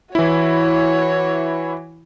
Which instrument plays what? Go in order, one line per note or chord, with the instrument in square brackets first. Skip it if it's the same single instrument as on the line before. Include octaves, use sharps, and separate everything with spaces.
[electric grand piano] E3 E4 [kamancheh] F#4 C#5